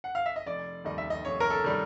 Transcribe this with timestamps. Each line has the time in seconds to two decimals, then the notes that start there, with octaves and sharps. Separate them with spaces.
0.04 F#5
0.15 F5
0.26 E5
0.36 D#5
0.46 F1 D5
0.84 D#2 D#3 G3 D#5
0.98 E5
1.10 D#5
1.25 F1 C#5
1.40 A#4
1.50 A4
1.64 D#3 G3